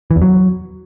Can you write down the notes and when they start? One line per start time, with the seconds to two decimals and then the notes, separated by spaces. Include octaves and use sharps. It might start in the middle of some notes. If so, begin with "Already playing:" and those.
0.11 E3
0.16 E2
0.22 F#3